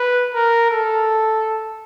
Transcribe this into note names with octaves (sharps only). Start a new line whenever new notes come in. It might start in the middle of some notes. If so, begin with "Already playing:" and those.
Already playing: B4
A#4
A4